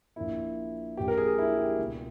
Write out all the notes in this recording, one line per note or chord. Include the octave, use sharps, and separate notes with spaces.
A#1 A#2 E4
A#1 A#2 G4
A#4
G#4
E4
G4
C#2 B2